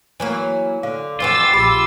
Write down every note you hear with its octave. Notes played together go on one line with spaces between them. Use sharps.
E3 F#3 A#3
D3 F5
F2 E3 F4 F#4 D6 E6 A6
A#1 G4 B5 E6